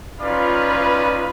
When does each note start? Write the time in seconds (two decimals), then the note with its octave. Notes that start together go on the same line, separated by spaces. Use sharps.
0.21 C#4 D#4 F4 B4 D5